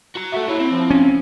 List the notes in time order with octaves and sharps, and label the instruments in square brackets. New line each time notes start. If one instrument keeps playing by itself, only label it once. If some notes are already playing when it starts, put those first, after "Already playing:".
[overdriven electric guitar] F#4 A#5
[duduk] F#4 [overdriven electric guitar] A4 E5
[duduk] E4 [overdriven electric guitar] G4 C#5
[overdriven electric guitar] C4
[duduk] F3
[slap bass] C#4